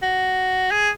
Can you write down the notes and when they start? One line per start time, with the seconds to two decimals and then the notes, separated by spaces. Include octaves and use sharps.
0.03 F#4
0.71 G#4